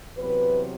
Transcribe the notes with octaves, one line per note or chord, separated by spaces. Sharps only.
E2 C3 F#3 B4